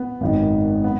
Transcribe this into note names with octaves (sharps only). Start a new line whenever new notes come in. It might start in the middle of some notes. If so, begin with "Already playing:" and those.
Already playing: B3
G#1 F#2 D#3
B3